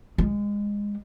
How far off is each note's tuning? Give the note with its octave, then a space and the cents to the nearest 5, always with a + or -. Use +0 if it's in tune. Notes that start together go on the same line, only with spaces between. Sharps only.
G#3 -20